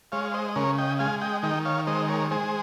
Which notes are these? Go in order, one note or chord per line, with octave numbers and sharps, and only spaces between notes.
G#3 C#5 F5
F5
C5 D#5
D#5
C#3 A#4 C#5
D#5 G5
G#3 F5 G#5
D#5 G5
D#3 D#5 G5
C#5 F5
G#3 C5 D#5
A#4 C#5
G#3 G#4 C5